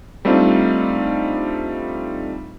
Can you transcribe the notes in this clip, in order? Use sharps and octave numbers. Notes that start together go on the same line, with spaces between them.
G3 A3 C4 D4 D#4 F4